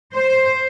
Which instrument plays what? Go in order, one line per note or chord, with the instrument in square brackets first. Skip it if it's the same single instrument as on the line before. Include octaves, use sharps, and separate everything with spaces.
[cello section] C5